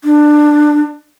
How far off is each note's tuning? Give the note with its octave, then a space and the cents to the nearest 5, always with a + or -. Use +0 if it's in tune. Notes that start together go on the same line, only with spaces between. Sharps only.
D4 +15